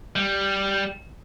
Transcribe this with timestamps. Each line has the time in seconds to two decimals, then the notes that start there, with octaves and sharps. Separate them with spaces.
0.16 G3